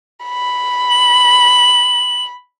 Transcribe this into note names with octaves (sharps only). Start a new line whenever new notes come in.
B5
F#7